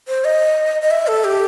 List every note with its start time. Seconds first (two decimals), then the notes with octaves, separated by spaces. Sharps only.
0.08 C5
0.25 D#5
0.82 D#5
0.91 E5
1.07 A4
1.24 G4